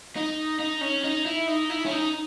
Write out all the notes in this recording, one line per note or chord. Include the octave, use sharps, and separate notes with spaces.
D#4
D#4
C#4
D#4
E4
D#4
E4
C#4
D#4